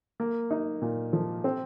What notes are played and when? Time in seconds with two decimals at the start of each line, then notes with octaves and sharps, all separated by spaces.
0.20 A#3
0.51 D#4
0.82 A#2
1.13 F3
1.44 C4